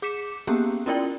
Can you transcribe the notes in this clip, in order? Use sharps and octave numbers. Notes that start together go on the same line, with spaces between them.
G#4 D6 B6 C#7 E7
A#3 B3 C#4 G4 G#4
C#4 E4 F4 A#4 D5 G5